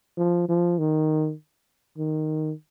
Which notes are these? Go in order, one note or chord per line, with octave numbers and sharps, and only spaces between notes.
F3
F3
D#3
D#3